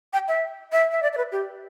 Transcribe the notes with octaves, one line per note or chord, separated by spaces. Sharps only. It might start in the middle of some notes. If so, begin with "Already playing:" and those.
G5
E5
E5
E5
D5
D5
B4
G4